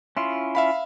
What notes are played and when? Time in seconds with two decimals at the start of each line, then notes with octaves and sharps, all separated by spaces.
0.17 C#4 E4 F4 C6
0.55 E5 F5 B5